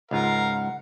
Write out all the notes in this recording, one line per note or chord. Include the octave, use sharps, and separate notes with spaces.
C#2 G#2 F4 A#4 F5 F#5